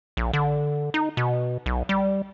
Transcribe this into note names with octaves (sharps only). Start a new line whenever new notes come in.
A#1
D3
D#4
B2
B1
G3